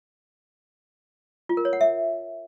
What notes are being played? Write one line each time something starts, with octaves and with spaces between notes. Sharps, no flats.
F4
A#4
C#5
F#5
E5